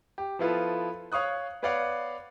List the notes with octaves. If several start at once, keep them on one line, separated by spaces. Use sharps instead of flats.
G4
F3 B3 E4 F4 A4 B4
C#5 F5 C#6 D#6 F#6
B3 B4 C#5 D5 F5 F#5